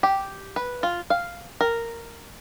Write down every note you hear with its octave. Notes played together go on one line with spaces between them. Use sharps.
G4
B4
F4
F5
A#4